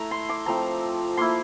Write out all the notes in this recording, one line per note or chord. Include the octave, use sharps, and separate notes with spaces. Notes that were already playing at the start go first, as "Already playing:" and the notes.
Already playing: A3 E4 A#5
C6
D6
F3 A3 C4 A#5
A#3 E4 C6